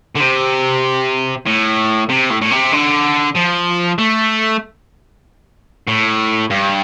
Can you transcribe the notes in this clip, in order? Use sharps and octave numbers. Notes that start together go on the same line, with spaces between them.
D3
C3
A2
C3
A2
A2
C3
D3
F3
A3
A2
G2